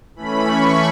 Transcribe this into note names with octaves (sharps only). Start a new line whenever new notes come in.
E3 A3 C#4 B5
C#6